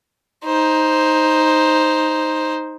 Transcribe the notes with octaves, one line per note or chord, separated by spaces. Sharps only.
D#4 C5